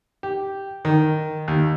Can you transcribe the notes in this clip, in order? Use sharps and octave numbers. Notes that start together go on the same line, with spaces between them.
G4
D#3
D#2